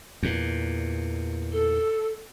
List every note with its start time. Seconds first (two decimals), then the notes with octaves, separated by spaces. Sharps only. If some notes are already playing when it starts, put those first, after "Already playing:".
0.23 E2 A#2
1.53 A4